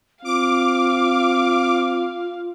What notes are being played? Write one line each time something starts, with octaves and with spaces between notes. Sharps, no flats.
C4 F4 F5 D6